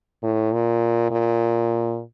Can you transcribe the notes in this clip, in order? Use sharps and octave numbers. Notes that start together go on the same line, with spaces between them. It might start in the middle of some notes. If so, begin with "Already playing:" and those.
A2
A#2
A#2